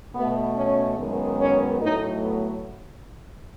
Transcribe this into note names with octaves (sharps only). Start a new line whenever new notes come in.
B2 A3 B3
C#4
F#2 D#3 G#3 B3
C#4
A2 F#3 A3 D#4
B3